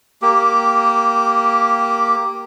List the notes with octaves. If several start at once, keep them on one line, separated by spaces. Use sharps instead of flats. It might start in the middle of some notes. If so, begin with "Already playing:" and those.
A#3 G4